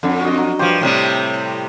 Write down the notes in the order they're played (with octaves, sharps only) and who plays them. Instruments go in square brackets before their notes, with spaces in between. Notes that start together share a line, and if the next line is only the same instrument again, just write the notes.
[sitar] F2 [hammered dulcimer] D3
[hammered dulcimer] F#4 D#5
F#3
[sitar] G2 F3 [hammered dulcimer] G4 C5 C#5
[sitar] A2 C3 G3